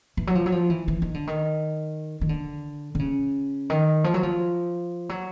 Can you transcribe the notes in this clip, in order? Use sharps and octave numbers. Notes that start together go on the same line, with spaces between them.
E3
F#3
F3
F#3
F3
E3
E3
D#3
D3
D#3
D#3
D3
D3
C#3
D#3
F3
F#3
F3
F#3